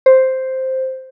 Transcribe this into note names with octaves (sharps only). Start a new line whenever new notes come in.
C5